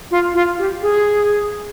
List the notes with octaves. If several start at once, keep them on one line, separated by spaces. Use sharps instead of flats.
F4
F4
G4
G#4